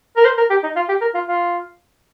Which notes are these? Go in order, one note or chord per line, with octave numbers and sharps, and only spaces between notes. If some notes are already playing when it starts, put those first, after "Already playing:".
A#4
C5
A#4
G4
D#4
F4
G4
A#4
F4
F4